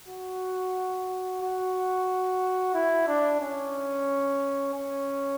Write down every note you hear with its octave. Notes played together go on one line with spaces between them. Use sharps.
F#4
F#4
E4
D4
C#4
C#4